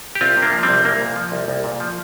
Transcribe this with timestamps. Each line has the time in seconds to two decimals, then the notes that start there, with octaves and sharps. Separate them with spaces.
0.15 G4
0.21 C2 C4 F4
0.37 C3
0.42 A#3 D4
0.53 F3
0.63 G3 C4
0.69 C2
0.85 C2 A#3
1.01 A#2
1.16 F3
1.32 C2
1.48 C2
1.64 A#2
1.80 F3